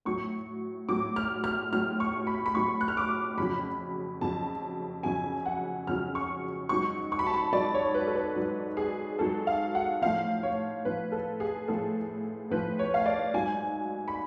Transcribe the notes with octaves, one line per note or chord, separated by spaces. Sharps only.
A2 F#3 C#6
A2 F#3 D6
F6
F6
A2 F#3 F6
C#6
B5
B5
A2 F#3 C#6
F#6
F6
D6
F2 C#3 F#3 B5
F2 C#3 F#3 A5
F2 C#3 F#3 G#5
F#5
F2 C#3 F#3 F6
C#6
G#2 F#3 C#6
C#6
B5
A5
B5
G#2 F#3 D5
C#5
B4
A4
B4
G#2 F#3
G#4
G#2 F#3 A4
F5
F#5
A2 F3 F5
C#5
A2 F3 B4
A4
G#4
A2 F3 A4
A2 F3 B4
C#5
F5
D5
G#2 F#3 G#5
B5